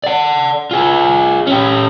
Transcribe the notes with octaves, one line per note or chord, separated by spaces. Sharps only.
D5 F#5
F4 G#4
C#4 G4